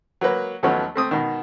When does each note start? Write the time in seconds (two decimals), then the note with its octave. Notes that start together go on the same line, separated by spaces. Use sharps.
0.21 F#3 A#3 B4
0.63 D#2 F3 F#3 A3 B3 C#4
0.96 A3 C4 D#6
1.11 B2 D#3